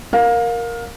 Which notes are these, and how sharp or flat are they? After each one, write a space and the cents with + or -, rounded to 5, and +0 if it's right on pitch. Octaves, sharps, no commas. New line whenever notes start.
A#4 +0 F5 +25